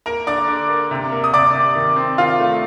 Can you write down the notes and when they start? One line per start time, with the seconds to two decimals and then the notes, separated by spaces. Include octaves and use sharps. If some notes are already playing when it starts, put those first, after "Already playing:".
0.06 A#3 A#4 A#5
0.27 D3 D5 D6
0.48 D3
0.69 A#3
0.91 C3
1.12 A#3
1.24 D#6
1.34 C3 D5 D6
1.55 C3
1.75 D#3
1.96 C4
2.18 D#3 F4 F5
2.40 A3